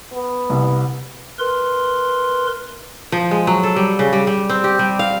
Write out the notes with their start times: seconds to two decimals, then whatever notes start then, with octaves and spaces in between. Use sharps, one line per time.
0.12 B3
0.50 C2
1.39 A#4 B4 C6
3.12 F3
3.31 G#3
3.47 F#3
3.63 A4
3.76 G3
3.99 C#3
4.13 G3
4.27 G3
4.49 C4
4.64 G4
4.79 G3
4.99 F5